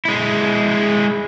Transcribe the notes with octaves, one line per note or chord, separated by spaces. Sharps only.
G#3 E4